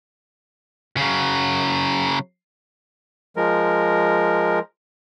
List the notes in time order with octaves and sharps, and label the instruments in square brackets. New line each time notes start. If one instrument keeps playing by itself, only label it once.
[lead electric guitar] C#3 F#3
[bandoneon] F3 G#3 A#4